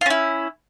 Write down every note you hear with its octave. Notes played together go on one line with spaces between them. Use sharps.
C#4 E4 F4